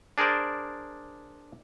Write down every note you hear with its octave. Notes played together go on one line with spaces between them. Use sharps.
D4 G#4 A#4 C5 D5